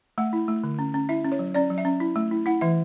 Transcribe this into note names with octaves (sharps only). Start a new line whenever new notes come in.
A3 F#5
E4
A3
D3
C#4
C#4
E4 E5
C#4
C#5
F#3
C#4 D5
F#3
E5
C#4
E4
A3
E4
E4 F#5
E3 E5